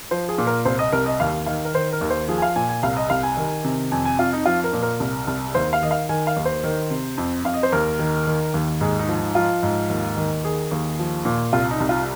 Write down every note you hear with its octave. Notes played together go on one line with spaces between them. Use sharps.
F3 C5
G#4
A#2
A#4
C2 C5
D#5
C2 A#4
D#5
D#2 F5
D#3 F5
A#4
D#3 C5
A#4
D#2
C5
F3 G#4
G#5
F5
A#2 G#5
G#5
C2 F5
D#5
C2 F5
G#5
D#3
C3
F2 G#5
G#5
F2 F4
D#4
F3 F4
A#4
A#2
A#4
C2
C2
D#2 C5
F5
D#3 D#5
F5
D#3 G#5
F5
D#2
C5
D#3
C3
F2
F2 F5
D#5
C5
D#2 A#4
D#3
D#3
D#2
G#2 G#4
D#4
F3
D#4
F3 F4
G#2
D#2
D#3
D#3 G#4
D#2
F3
A#2
C2 F4
D#4
C2
F4